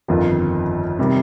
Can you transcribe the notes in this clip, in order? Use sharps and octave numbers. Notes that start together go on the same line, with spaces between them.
G1 F2 D#3 F4
C3 D#3 G3